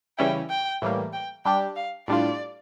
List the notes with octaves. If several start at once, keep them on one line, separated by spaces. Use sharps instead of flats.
C#3 E3 G3 C#4 E4 G5
G5
A2 E3 G3 A#3
G5
G3 D4 G4 G5
F5
A2 G3 D4 F4 D5